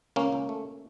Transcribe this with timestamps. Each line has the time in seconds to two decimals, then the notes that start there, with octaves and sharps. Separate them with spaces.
0.16 C#2 A#3 C#4
0.32 C#2
0.49 A3